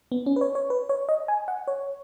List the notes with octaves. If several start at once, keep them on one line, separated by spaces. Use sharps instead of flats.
B3
C#4
B4
C#5
C#5
B4
C#5
D#5
G#5
F#5
C#5